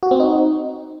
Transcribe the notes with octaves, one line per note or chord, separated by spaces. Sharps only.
F#4
C4
D#4